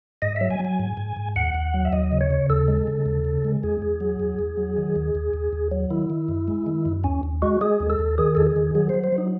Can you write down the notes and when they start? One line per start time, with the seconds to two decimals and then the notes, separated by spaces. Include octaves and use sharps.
0.22 G#2 D#5
0.36 F#3 E5
0.50 G#5
0.60 F#3
0.65 G#5
0.79 G#2
0.97 G#2
1.17 G#2
1.36 D#2 F#5
1.54 D#2
1.74 F#3
1.85 E5
1.93 D#2 D#5
2.12 C#3
2.21 C#5
2.30 C#3
2.50 D#2 A4
2.68 G#3
2.87 C#3
3.06 D#2
3.25 C#3
3.45 G#3
3.63 E2 G#4
3.82 E2
4.00 F#3
4.20 E2
4.39 E2
4.57 F#3
4.77 D#3
4.96 D#2
5.15 D#2
5.34 D#2
5.53 D#2
5.71 F#3
5.90 D#3 E4
6.10 D#3
6.29 F#2
6.48 G#3
6.66 D#3
6.85 F#2
7.04 D#2 C#4
7.23 D#2
7.42 G#3 F#4
7.61 G#3 G#4
7.80 D#2
7.90 A4
7.99 D#2
8.18 D#3 G#4
8.35 E2 A4
8.46 G#4
8.56 D#3
8.75 F#3 G#4
8.89 F#3 C5
9.04 C5
9.12 F#3
9.18 D#4